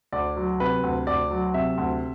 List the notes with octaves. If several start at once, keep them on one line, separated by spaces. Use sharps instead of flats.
D2 D5
F#3
C3 B4
D2
D2 D5
F#3
C3 E5
D2